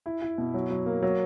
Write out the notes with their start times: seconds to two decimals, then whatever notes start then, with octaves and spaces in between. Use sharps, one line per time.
0.06 E4
0.22 E4
0.38 B2
0.54 F#3
0.71 F#3
0.86 A#3
1.02 F#3